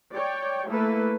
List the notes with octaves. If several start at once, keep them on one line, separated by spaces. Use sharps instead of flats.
C#5 D5 G5
A3 A#3 E4 A4 B4